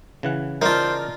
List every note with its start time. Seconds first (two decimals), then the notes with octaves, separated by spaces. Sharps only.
0.23 C#3 E3 F#5
0.62 D#4 F4 A#4 C5 D5 A5